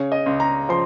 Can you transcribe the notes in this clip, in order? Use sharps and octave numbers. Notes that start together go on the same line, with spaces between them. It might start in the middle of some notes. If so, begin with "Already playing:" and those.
Already playing: C#3 C#5
D#5
C#2
A#5
F3 C6